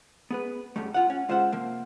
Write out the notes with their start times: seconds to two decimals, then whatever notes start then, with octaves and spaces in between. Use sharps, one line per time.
0.31 B3 G#4 B4
0.76 C#2 F#2 C#3 G3 A3
0.94 F4 F#5
1.10 C#4
1.29 G#3 F4 C5 E5 F#5
1.52 C3 F3 A#3